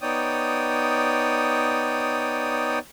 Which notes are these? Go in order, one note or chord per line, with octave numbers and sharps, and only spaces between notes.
B3 D#4 C#5 D5 G5 D#6